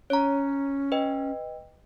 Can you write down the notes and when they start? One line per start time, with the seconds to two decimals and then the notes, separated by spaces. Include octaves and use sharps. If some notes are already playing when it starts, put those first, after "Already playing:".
0.10 C#4 C#5 A#5
0.92 B4 D#5 G5